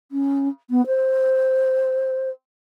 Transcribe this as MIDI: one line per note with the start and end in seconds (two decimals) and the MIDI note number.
0.12 0.49 61
0.70 0.85 59
0.87 2.30 72